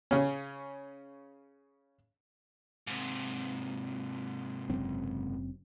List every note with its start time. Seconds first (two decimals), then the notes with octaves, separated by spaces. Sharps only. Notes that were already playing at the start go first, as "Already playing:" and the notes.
0.11 C#3 C#4
2.87 G#2 C3
4.70 F#1 F#2 C4